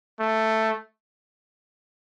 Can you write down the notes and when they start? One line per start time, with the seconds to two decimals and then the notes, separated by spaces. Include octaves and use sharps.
0.20 A3